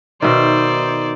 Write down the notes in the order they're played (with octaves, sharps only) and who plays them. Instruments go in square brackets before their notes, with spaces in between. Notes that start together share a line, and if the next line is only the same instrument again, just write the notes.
[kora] B2 D#3 [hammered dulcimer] D#4 E5 [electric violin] C5 D5